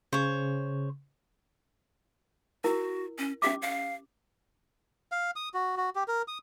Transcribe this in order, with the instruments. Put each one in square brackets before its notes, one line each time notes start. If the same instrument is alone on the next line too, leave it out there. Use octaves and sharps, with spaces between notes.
[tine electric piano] C#3 [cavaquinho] C5 C#5
[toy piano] E4 A#4 [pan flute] F#4
[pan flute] C#4
[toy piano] C#4 G4 D6 [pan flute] E5
[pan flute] F5
[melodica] F5
D#6
F#4
F#4
G4
A#4
D#6